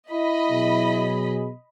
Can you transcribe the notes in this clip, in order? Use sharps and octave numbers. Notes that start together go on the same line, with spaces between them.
E4 D#5 B5
B2 F#3 G#4